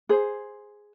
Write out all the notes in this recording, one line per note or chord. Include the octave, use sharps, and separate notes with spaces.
G#4 C5